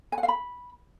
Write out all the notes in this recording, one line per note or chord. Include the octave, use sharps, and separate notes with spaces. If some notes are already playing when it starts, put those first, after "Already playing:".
G#5
F#5
F5
B5